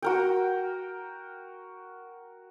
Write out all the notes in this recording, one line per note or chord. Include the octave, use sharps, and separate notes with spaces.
F#4 A#4 G5